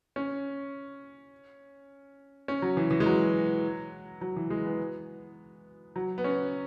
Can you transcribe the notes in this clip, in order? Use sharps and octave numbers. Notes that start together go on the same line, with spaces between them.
C#4
C#4
F#3
E3
E3
G#3
F#3
F#3
E3
G#3
B3
F#3
B3
C#4